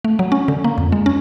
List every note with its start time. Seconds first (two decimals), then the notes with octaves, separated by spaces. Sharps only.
0.05 A3
0.19 F#3
0.32 C#4
0.48 D3
0.64 A#3
0.78 F2
0.92 G#3
1.06 C#4